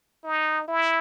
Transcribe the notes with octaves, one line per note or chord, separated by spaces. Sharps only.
D#4
E4